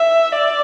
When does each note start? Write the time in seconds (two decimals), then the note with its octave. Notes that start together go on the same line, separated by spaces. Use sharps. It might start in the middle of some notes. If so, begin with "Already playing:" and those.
Already playing: E5
0.32 D5